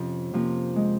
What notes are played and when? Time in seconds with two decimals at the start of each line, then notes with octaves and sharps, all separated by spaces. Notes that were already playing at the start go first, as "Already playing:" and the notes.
Already playing: F2 C3 F3 C#4
0.34 C3 F3 A#3 C#4
0.76 G#3